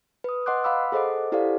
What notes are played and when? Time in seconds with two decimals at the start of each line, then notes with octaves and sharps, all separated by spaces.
0.24 B4 D#6
0.46 B4 D#5 F#5 C6 D6 F#6
0.64 F5 F#5 B5 D6 E6
0.92 G#4 A4 C5 D#5 F#5 D6
1.32 E4 G4 A4 C5 D5 F5